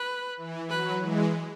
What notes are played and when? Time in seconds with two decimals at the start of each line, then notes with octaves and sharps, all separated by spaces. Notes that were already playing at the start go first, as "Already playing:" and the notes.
Already playing: B4
0.37 E3
0.69 F#3 B4
1.01 E3 G#3